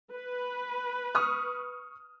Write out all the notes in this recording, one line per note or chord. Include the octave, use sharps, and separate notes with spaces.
B4
C#6 D#6 F6